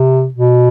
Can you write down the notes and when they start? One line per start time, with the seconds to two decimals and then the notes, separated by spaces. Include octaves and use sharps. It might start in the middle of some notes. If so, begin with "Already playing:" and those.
Already playing: C3
0.34 B2